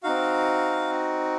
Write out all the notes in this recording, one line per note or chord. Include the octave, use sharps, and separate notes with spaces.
C4 D#4 F#4 F5